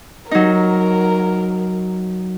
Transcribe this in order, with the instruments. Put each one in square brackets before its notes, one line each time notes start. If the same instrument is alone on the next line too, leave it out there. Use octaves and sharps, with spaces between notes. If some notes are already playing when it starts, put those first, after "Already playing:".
[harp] F#3 D#4 [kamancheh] A#4